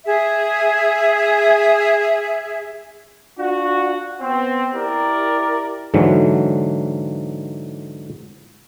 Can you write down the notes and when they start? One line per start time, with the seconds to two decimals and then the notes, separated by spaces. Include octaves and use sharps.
0.05 G#4 E5
3.39 D4 F4 F#4
4.21 B3 C4
4.75 E4 G4 A#4 D5
5.94 G#2 D3 E3 F#3